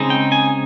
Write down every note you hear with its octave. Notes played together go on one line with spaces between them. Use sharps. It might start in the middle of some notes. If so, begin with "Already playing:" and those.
Already playing: C#3 G#3 C4 D#4
G5
G#5